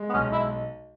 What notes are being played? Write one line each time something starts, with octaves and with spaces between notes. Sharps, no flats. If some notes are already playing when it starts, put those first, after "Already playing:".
Already playing: G#3
B3
B1 C#4
E4